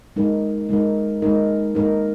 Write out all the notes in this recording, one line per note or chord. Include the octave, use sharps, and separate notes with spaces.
G#3 D#4 A#4
G#3 D#4 A#4
G#3 D#4 A#4
G#3 D#4 A#4